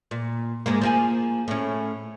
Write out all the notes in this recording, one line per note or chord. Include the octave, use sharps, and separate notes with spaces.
A#2
G#2 G#3 A#3
F3 A#3 G#4
A2 C#4